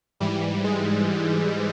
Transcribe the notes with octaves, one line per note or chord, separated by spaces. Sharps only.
G#2 E3 G3
G#3